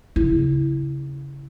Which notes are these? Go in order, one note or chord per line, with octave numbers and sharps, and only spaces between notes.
C#3 E4